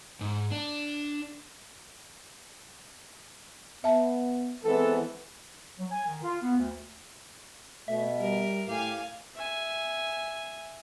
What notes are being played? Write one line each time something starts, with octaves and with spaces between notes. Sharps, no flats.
G#2
D4
B3 E5 A5
E3 G#3 B3 C4 A4
F#3
G#5
D#3
F4
B3
D2
B2 A3 E5
G3 A#4
A2 G4 F5 G#5
E5 G#5